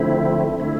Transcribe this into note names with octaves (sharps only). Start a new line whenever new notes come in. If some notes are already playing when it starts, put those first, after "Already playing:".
Already playing: D3 F3 A3 C4 E4
D3 A3 E4